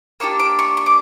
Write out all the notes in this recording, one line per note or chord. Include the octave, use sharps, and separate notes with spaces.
A#3 D4 G4 C#6
D6
C#6
C#6
D6